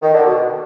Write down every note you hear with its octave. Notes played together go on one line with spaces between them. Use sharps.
D#3
D3
B2